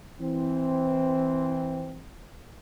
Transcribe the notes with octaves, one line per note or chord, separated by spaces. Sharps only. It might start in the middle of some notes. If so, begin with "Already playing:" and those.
E3 C4